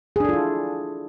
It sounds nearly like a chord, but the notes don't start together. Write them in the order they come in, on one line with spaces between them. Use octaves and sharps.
G#4 D4 A4 F4 E4